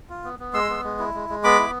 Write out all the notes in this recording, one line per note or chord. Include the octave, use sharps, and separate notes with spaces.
F4
B3
B3
G#3 C6 E6
B3
G#3
E4
G#3
G#3
B3 B5 D6
E4